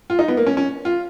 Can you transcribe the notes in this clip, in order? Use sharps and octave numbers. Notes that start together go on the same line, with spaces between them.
F4
D#4
B3
A#3
C#4
C#4
F4